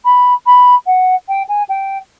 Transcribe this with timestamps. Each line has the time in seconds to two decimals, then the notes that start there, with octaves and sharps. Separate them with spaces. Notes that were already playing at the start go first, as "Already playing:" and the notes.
0.05 B5
0.46 B5
0.86 F#5
1.28 G5
1.49 G#5
1.69 G5